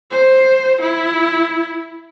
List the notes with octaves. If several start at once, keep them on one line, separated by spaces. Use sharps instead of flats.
C5
E4